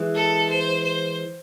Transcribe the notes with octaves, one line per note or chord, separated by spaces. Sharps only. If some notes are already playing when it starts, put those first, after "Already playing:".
Already playing: E3 G#3
A4
C5
C5